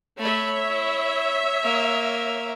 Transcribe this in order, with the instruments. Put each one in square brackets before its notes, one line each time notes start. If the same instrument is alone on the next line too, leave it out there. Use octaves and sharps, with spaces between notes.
[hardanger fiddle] A3 B5 [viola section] C#5 E5
[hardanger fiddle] E4
A#3 A#5